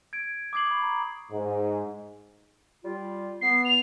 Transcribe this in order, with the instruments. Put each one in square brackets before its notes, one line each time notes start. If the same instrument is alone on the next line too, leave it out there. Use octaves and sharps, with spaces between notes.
[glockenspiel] G#6 D7
D6 D#6 G#6 C7 F#7
B5 C#6
A#5
[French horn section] G#2
[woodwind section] G3 F4
[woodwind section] B3 [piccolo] C7
[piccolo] F7